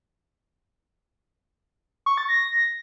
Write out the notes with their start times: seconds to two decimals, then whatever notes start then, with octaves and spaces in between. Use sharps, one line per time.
2.06 C#6
2.17 A6
2.29 A#6